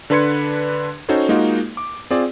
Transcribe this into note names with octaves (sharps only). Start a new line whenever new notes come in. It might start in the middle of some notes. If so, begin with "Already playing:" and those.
D3 D4 B4 C6 G#6 C#7
C#4 D#4 F#4 A4 C5 C#5
G#3 A#3 D#4 F4 F#4
D6
C4 F4 G#4 D5